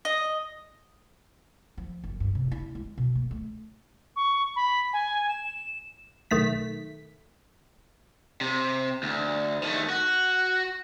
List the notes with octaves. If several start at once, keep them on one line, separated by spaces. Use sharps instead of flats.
D#5
F3
F#1
G2
C3
E4
G#3
B2
A#3
A3
C#6
B5
G#5
E7
B1 D#3 A3 B6
C3
D2
D#3 A3
F#4